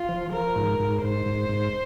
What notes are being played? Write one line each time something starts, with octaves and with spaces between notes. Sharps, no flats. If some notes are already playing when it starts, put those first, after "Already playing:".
Already playing: F4
F3
F3 A#4
G#2
G#2
G#2 C5
G#2
G#2